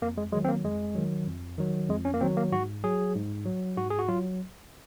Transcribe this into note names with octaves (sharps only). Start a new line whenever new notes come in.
F2 A#3
G#3
D#3 F#3 G#3
C4
A#3
F2 G#3
D#3 F#3
F2
D#3 F#3
F2 G#3
C#4
A#3
D#3 F#3 C4
A#3
G#2 F#4
F#3 G#4
G#2
F#3
G#2 F#4
G#4
F#4
F#3 F4